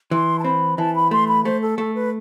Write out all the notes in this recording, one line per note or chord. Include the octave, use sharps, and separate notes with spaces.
E3 C6
A5
C4 B5
E3 A5
B5
A3 C6
B5
A3 C5
A4
A3 A4
B4